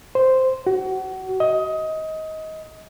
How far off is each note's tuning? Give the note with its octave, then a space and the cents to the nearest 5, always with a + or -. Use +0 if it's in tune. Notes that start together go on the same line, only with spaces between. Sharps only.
C5 -5
F#4 +30
D#5 +20